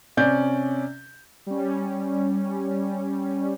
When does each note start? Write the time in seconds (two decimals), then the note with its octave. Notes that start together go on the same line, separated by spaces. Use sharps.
0.17 C3 C#4 D5 G6
1.47 G3 C#4